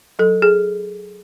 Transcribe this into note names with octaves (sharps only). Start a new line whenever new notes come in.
F#3 A4
G#4